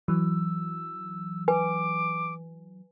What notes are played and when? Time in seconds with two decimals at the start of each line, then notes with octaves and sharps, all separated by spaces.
0.08 E3 F#3 E6
1.48 B4 G#5 D6